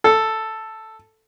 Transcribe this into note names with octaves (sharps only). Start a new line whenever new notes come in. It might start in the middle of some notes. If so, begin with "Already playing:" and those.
A4